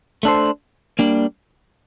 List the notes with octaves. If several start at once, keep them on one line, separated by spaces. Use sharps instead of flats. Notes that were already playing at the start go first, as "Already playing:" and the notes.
A3 D4 A4 C5
G3 A#3 D4